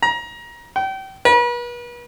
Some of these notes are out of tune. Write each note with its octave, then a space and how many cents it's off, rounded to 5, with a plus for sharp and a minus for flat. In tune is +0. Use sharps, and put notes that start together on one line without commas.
A#5 +25
G5 -30
B4 -40